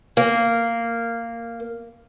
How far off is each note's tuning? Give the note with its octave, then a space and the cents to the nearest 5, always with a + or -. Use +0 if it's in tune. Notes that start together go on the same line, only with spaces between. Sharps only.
A#3 -10